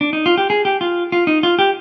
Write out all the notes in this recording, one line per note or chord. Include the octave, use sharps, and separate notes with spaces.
D4
D#4
F4
G4
G#4
G4
F4
F4
D#4
F4
G4